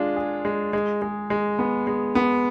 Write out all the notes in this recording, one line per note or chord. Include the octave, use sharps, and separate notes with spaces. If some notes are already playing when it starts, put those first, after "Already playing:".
Already playing: G#3 D4 F4
G#4
G#3
G#3
G#3
G#3
B3
G#3
B3